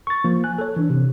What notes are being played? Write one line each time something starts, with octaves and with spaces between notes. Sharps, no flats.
C#6 A6
F3 A#3
G#5 F#6
A4 C#5
E3 D4
C3